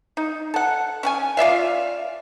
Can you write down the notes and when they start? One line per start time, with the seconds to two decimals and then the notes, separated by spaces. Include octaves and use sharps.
0.17 D#4
0.54 A4 F#5
1.03 C#4 F#5 G#5
1.37 F4 D5 E5 F5